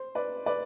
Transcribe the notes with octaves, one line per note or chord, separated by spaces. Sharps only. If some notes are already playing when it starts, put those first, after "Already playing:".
Already playing: C5
B4 D5
B4 D5